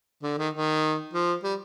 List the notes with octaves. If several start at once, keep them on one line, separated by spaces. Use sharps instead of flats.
D3
D#3
D#3
F3
G3